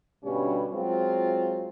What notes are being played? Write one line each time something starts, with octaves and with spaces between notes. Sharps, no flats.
G2 B2 D3 G3 C#4
F#3 G#3 C4 F4